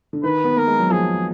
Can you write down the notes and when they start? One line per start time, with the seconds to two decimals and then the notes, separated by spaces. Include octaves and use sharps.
0.13 D3
0.24 D#3 B4
0.44 B3
0.56 A#3 A#4
0.68 G#3
0.80 F#3
0.90 F3 G#4